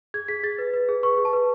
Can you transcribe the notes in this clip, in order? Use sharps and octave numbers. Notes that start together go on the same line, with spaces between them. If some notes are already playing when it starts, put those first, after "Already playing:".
G#4 G#6
G#4 B6
G#4 A6
B4
B4
G#4
B4 C#6
G#4
A5
B4